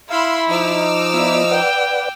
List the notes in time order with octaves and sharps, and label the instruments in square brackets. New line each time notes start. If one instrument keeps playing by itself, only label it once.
[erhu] E4 [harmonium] F5 [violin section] B5 C6 E6
[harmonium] F3 D#4 [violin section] D6 E6 F6
[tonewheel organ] B3 F4 D5 [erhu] E4
[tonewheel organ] B4 D5 F#5 [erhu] G5